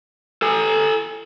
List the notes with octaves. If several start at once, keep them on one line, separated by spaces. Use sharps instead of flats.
A4 G#5